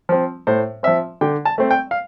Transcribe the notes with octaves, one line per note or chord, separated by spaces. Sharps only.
F3 C4
A2 C5
F3 C4 E5
D3 G5
A5
A3 C4
G5
F5